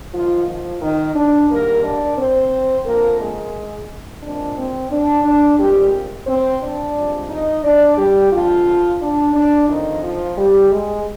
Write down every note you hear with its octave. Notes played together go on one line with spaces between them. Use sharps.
G#2 D#3 F3 A#3 F4
F3 F4
D#3 D#4
D4
G#2 D#3 G3 A#3 A#4
D4 D5
C4 C5
D3 F3 A#3 C4 A#4
G#3 G#4
A#2 G#3 C4 D4
C4
D4
D4
A#2 G3 G#3 C4 G4
C4 C5
D4 D5
G2 F3 G#3 C4
D#4 D#5
D4 D5
G3 G4
D3 F3 G#3 C4 F4
D4
D4
D3 D#3 F3 C4 D#4
F3 F4
G3 G4
G#3 G#4